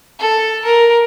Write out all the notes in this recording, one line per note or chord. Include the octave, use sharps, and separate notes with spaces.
A4
A#4